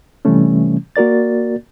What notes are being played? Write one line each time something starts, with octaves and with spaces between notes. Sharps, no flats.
C3 E3 G3 A3 C#4
A#3 F#4 A#4 D5 A6